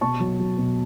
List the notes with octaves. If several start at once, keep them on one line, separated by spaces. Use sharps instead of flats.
B2 A5 C#6
F#3
F#3
B2